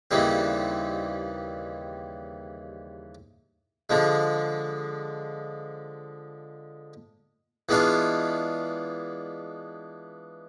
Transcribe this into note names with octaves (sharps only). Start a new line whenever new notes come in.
D#2 C#3 E3 G3 C4
D3 F3 G#3
E3 G#3 B3 D4 F4